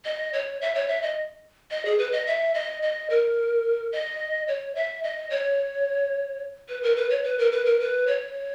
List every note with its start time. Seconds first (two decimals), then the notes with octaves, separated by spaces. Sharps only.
0.05 D#5
0.33 C#5
0.61 E5
0.75 C#5
0.88 E5
1.02 D#5
1.71 D#5
1.85 G#4
1.98 B4
2.12 D#5
2.27 E5
2.54 D#5
2.82 D#5
3.10 A#4
3.93 D#5
4.48 C#5
4.75 E5
5.04 D#5
5.30 C#5
6.69 B4
6.83 A#4
6.96 B4
7.10 C#5
7.24 B4
7.39 A#4
7.52 B4
7.66 A#4
7.80 B4
8.07 C#5